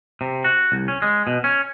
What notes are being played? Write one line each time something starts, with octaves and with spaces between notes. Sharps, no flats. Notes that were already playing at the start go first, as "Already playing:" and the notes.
C3
F#4
C2
C#4
G#3
B2
C#4